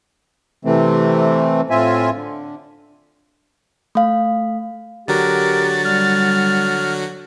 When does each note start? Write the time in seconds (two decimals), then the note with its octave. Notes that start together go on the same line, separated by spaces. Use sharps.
0.65 C3 E3 A3 C4
1.70 A2 C4 F4 E5 G#5
2.13 D3
3.95 A3 F5
5.08 D3 F#3 F#4 G4 A#4 A6
5.85 G3 F6